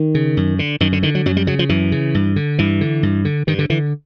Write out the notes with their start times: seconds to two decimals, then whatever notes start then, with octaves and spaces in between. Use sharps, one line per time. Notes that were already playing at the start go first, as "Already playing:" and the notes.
Already playing: D#3
0.15 C#3
0.37 F#2
0.59 D3
0.80 F#2 D#3
0.92 D3
1.03 D3 D#3
1.15 F#3
1.26 F#2 F#3
1.37 G3
1.47 C#3 F#3
1.59 F3
1.69 F#2 E3
1.92 C#3
2.15 G2
2.36 D3
2.59 G2 E3
2.81 D3
3.03 G2
3.25 D3
3.47 G2 D#3
3.59 D3
3.70 D3 E3